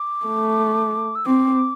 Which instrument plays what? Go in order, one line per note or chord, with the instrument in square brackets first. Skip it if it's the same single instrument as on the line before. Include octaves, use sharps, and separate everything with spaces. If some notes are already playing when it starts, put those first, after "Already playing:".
Already playing: [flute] D6
[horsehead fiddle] A3
[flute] E6
[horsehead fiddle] C4 [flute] D6